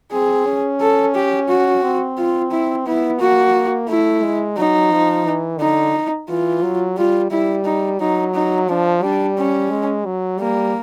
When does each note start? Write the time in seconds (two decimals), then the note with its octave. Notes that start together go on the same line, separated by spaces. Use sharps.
0.12 C4 G#4
0.46 C#4
0.81 A4
1.15 G4
1.49 F#4
1.83 C4
2.18 F4
2.51 E4
2.86 B3 E4
3.20 A#3 F#4
3.89 A3 E4
4.23 G#3
4.57 F#3 D#4
4.92 F3
5.26 E3
5.60 D3 D#4
6.29 E3 F4
6.62 F#3
6.97 G3 F4
7.31 G3 E4
7.65 D#4
8.00 F#3 D#4
8.34 D#4
8.69 F3 D4
9.02 G3 D4
9.37 C#4
9.71 G#3
10.06 F#3
10.39 G3 A#3